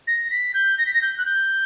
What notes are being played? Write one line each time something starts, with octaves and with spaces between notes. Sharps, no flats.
A#6
B6
G6
A#6
B6
A#6
G6
F#6
G6